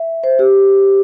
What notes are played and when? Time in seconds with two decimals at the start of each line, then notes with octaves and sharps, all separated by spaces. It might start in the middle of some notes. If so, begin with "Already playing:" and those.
Already playing: E5
0.24 C5
0.39 G4